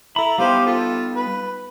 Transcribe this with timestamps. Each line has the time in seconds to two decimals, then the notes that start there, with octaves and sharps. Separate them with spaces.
0.16 E4 A4 A#5 B5
0.38 G3 B3 D#4 G4 C5 F5
0.66 F4 A4
1.16 B4